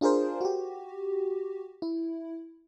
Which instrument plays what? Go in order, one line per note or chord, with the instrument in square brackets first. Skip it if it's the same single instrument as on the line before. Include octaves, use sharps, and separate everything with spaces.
[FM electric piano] D4 F4 G#4 A#4 C5
F#4 G4
E4